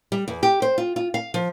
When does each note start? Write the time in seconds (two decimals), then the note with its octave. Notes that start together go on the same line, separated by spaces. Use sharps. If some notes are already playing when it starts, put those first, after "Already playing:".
0.12 G3
0.28 E2
0.43 G4
0.62 C5
0.78 F4
0.96 F4
1.14 F5
1.34 F3